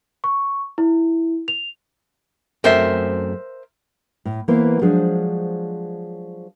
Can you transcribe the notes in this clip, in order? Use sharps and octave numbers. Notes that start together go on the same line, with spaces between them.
C#6
E4
F7
F#2 A3 C4 A#4 C5 E5
A2
E3 A#3 B3 E4 C5
F3 F#3 G#3 D4 G#4 C5